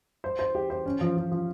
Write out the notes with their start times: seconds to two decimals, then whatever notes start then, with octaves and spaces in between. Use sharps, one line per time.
0.24 C5
0.39 C5
0.55 G4
0.70 C5
0.86 C#4
1.01 F3
1.17 F3
1.32 F3